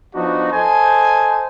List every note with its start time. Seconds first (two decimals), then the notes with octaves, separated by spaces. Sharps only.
0.14 F3 B3 D4 D#4 F#4
0.52 A4 C5 D#5 G#5 A5